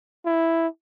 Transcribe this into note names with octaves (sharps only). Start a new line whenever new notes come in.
E4